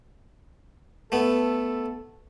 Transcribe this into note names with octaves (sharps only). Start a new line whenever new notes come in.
A3 B3 A4